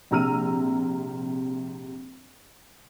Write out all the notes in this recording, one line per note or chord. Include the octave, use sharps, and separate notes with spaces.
A#1 C3 A#5 E6 F6 D#7